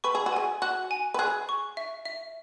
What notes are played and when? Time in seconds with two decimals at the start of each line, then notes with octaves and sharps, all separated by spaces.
0.04 B4 C#6
0.15 G#4
0.26 F#4
0.33 G#4 G#5
0.62 F#4 F#6
0.91 G#5
1.14 B4
1.19 G#4 F#6
1.49 C#6
1.77 E5
2.05 E5